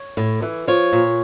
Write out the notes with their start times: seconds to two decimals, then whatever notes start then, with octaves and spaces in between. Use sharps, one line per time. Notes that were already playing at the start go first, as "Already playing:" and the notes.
Already playing: C#5
0.17 A2
0.42 E3
0.67 F3 C#5
0.92 A#2